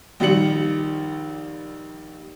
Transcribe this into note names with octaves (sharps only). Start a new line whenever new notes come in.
A#1 D#3 G3 C#7 F#7